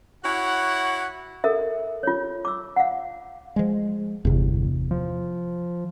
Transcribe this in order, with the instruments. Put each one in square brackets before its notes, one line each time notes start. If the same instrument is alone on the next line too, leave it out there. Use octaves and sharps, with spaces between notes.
[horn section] E4 F#4 C#5 F#5
[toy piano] A4 A#4 E5
F4 C#5
D6 E6
F5 F#5
[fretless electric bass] F3 G#3
[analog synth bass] G1 [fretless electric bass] E2 C3
[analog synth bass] F3